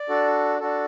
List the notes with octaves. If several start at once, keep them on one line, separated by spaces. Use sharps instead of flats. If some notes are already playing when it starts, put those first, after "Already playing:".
Already playing: D5
D4 F#4 A4
D4 F#4 A4